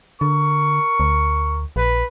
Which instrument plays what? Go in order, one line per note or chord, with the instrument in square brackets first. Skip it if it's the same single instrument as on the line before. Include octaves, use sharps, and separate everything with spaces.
[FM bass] D3 [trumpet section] A#4 C#6
[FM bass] D2
[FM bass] A#1 [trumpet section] B4